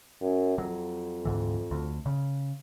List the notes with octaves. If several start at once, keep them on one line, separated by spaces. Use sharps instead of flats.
F#2
F2 F#3
D2 G#2 E3
D2
C#3